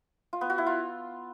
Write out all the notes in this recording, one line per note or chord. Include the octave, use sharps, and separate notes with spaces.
F4
B3
F#4
E4
F4